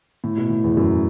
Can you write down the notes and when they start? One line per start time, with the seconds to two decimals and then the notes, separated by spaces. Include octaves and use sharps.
0.24 A2
0.37 B2
0.50 A2
0.64 E2
0.77 F#2